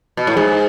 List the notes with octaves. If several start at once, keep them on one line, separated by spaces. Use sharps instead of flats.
B2
A2
G#2 G#4